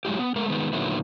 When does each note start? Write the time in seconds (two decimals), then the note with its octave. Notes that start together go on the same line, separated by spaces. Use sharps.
0.05 F#3 G#3 E4 G4
0.19 B3
0.36 G#3 A3 A#4
0.48 D#3 G#3 B3
0.73 A#2 D3 D#3 F#3 B3 E4